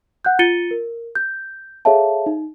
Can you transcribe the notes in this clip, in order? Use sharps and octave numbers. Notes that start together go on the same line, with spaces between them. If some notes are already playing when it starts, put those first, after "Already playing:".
F#5 F#6 G6
F4 A6 C#7 D#7 G7
A#4
G6
G#4 A4 C#5 E5 F5 A5
D#4